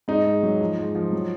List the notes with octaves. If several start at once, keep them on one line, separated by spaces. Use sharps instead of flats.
G#2 D#4
G#2
F#3
F3
G#2
F3
F#3